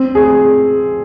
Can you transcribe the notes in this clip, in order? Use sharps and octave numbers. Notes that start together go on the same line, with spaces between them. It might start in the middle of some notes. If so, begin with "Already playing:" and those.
Already playing: C4
G#4